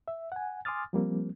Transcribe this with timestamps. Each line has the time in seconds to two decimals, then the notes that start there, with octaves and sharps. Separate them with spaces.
0.08 E5
0.32 F#5 G#5
0.65 G#5 C6 D6 D#6 F6 A6
0.93 F3 G3 A#3 C4